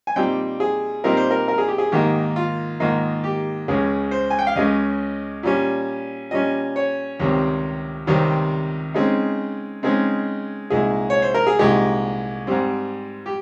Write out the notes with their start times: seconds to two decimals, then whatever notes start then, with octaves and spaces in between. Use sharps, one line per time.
0.07 G#5
0.16 A#2 G3 C4 D#4 G5
0.60 G#4
1.04 A#2 G3 C4 D#4 A#4
1.17 C5
1.31 A#4
1.48 A#4
1.58 G#4
1.68 G4
1.78 G#4
1.92 G#2 D#3 A#3 D#4 G4
2.36 F4
2.80 G#2 D#3 A#3 D#4 F4
3.24 G4
3.68 C#2 C#3 G#3 G#4
4.11 C5
4.30 G#5
4.39 G5
4.47 F5
4.56 C#2 C#3 G#3 D#5
5.43 A#2 G3 C#4
6.31 A#2 G3 C#4 D#5
6.76 C#5
7.20 C#2 C3 D#3 G3 C4
8.07 C#2 C3 D#3 G3 C4
8.94 C#3 G#3 C4 D#4
9.83 C#3 G#3 C4 D#4
10.70 C2 A#2 G#3 D#4 G#4
11.10 C#5
11.22 C5
11.34 A#4
11.47 G#4
11.59 C2 A#2 G#3 D#4 G4
12.47 G#2 G3 C4
13.26 G4